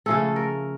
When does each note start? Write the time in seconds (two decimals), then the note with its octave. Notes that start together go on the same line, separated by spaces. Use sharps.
0.06 C#3 F3 A3 C#4 A4
0.36 A#4